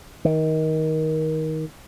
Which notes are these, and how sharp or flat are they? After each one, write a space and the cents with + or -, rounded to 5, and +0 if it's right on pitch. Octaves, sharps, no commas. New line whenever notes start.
D#3 +20